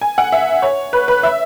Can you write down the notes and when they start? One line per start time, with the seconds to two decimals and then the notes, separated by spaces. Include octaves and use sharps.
0.01 G#5
0.18 F#5
0.32 E5
0.62 C#5
0.93 B4
1.08 B4
1.23 E5